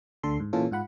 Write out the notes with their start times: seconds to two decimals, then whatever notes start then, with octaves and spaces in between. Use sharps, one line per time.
0.23 D2 D3 A4 C6
0.40 G#2
0.53 A#2 E3 C#4 F4 A4
0.71 G#2 F4 F#5 B5